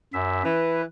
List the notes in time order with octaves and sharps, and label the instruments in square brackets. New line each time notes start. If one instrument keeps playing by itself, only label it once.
[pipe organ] F#2 E5
[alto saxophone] E3 [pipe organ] B4